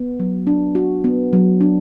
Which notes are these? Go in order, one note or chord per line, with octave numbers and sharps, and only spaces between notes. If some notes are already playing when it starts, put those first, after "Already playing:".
Already playing: B3
F#3
D4
F#4
B3
F#3
D4